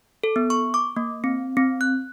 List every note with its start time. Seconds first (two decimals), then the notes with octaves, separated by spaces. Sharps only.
0.23 A4
0.36 B3
0.50 C#6
0.74 D6
0.96 A#3
1.24 C4
1.57 C4
1.81 F#6